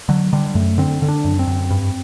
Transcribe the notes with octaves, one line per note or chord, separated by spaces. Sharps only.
D3 F#3
D3 G3
F#2 A3
D3 C4
D3
D4
F#2
C4
F#2
G2